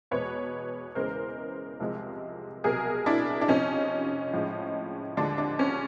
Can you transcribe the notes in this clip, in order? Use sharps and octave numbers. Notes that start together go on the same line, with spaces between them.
E2 B2 G#3 B4 C#5
E2 C#3 E3 G#3 A#4 C5
C2 C3 F3 G#3
C2 B2 F#3 G#4 A#4
D4 E4
D4
F2 C3 F3 C#4 D#4
A2 F3 G#3
D#2 D3 F3 G#3 D4
D4
C#4